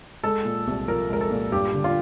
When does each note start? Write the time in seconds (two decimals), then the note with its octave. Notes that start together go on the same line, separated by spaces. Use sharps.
0.24 G#3 A4
0.45 A#2
0.67 C2
0.88 F3 A#4
1.10 G#3 A#4
1.21 A4
1.31 A#2
1.52 G2 G4
1.74 D3
1.84 F4